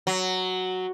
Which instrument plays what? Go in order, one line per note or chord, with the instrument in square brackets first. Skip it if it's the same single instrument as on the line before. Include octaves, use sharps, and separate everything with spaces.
[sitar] F#3